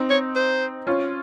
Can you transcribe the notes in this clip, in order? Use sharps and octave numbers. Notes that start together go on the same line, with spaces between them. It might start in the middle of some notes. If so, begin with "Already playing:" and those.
Already playing: C4 D#4
C#5
C5
C#4 F4